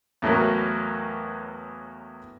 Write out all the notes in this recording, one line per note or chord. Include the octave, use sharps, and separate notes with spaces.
E2 A2 F#3 A#3